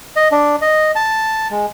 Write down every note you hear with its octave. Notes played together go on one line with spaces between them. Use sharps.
D#5
D4
D#5
A5
G#3